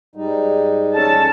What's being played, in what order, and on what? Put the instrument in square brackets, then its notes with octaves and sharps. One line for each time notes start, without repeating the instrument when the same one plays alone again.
[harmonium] G#2 G3 D#4
[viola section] C#4 A4 A5